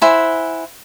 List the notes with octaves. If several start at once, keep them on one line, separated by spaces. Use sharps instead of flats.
E4 C5 F#5 G#5